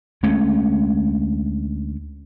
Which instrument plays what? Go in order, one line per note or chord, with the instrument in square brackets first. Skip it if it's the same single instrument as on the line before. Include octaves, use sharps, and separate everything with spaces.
[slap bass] D2 G#3 A3 C#4